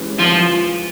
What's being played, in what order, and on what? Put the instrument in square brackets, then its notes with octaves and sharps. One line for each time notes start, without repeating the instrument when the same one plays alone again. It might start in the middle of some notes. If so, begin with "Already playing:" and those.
Already playing: [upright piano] E3 G#3 C#4 G4
[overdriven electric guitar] F3